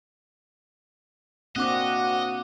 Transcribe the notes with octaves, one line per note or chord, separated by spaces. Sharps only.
A#3 C4 D4 F#4 D#5 D6 F#6